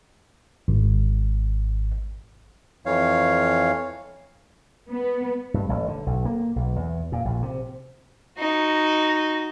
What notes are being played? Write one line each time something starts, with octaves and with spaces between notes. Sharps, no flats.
G#1
F2 E3 C#5 F5
B3
G2
A1
D3
B1
A#3
B1
E2
A#2
A#1
C3
D#4 F#4